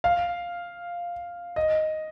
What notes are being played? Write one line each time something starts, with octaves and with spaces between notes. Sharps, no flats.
F5
D#5